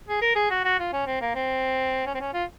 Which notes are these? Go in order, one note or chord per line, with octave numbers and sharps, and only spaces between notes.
G#4
A#4
G#4
F#4
F#4
F4
C#4
C4
A#3
C4
C#4
C4
C#4
F4